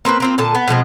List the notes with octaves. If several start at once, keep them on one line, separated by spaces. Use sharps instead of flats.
A#3 C4 A#4 B4
A#3 C4 F4
A#2 D3 A5
B3
B2 F3 G#3 C4